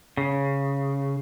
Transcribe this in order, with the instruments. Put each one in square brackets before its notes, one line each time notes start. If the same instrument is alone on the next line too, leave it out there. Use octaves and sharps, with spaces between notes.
[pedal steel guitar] C#3